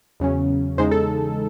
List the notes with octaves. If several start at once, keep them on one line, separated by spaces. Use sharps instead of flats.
E2 C#3 F#3 C#4
E2 C#3 G#3 D#4 C5
A4